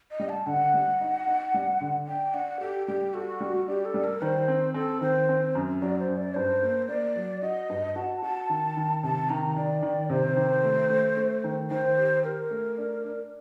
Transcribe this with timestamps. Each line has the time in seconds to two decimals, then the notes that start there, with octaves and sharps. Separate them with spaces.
0.11 D#5
0.20 G3
0.29 A5
0.46 D3 F#5
0.74 G3
1.01 D#4
1.27 D#4
1.54 G3
1.81 D3
2.07 D4 G5
2.34 D4 F#5
2.60 G4 A4
2.87 G3 G4
3.14 F#4 A4
3.41 G3
3.68 D4 G4
3.85 A4
3.94 G3
4.04 A#4
4.22 D#3 C5
4.48 C4
4.74 C4 A4
5.01 D#3 C5
5.29 C4
5.55 F#2
5.82 F#3 D5
5.99 C5
6.08 F#2
6.17 D5
6.35 G2 C5
6.63 A#3
6.88 A#3 D5
7.16 F#3
7.42 F#4 D#5
7.70 G2
7.95 F#4 A5
8.22 F#4 A5
8.49 D#3
8.77 D#3
9.03 C3 A5
9.30 D#3 A#5
9.56 D#3 D5
9.82 D#3
10.09 C3 C5
10.37 D#3
10.63 A3
10.90 A3
11.17 A3
11.44 D#3
11.71 D#3 C5
11.97 G4
12.24 G4 A#4
12.51 A3
12.78 D4
13.04 D4